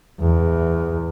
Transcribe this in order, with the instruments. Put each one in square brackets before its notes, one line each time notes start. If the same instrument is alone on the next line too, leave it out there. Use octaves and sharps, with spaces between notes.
[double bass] E2